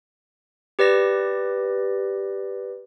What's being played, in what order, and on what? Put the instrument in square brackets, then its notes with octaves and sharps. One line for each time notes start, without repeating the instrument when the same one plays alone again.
[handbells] G4 B4 D5 A#6